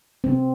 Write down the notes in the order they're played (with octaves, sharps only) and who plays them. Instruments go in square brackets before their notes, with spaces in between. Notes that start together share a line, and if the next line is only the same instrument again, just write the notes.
[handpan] C4